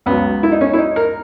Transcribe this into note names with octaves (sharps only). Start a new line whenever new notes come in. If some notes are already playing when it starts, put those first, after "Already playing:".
C#2 C#3 F#3 B3
E4
D#4
C#4
E4
D#4
A#4